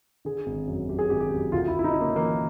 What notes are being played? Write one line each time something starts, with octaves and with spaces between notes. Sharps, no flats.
D3 G#4
G#1
F#2
F#2 G4
G#4
G#1 G4
G4
F#2
D2 F4
E4
D2
E4
D#4
C#3
A#3
E3 A#3